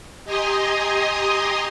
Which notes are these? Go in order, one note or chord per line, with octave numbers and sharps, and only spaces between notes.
G4 D#5 G#5 A#5 C6 D#6